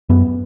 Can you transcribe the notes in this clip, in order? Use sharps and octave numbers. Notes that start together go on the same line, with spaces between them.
F#2 B3